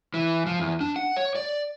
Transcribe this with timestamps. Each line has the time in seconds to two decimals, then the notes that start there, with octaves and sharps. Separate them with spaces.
0.14 E3
0.46 F3
0.60 E2
0.81 D4
0.96 F#5
1.17 C#5
1.35 D5